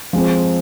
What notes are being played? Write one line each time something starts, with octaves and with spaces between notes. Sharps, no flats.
F3 G#3 C4